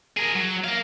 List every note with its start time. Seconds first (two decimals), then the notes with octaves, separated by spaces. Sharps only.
0.17 G#4 A#4
0.35 F#3
0.64 A#4 F5